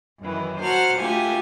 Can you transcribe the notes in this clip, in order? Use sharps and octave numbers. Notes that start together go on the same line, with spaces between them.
F#2 D#3 E3
F#3 C5 F#5 A5 F6
D2 A3 F4 G4 G#5